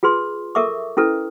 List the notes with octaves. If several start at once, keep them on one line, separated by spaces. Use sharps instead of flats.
F4 G#4 B4 C6
A4 A#4 E5 C#6 D6
C#4 E4 A4 B4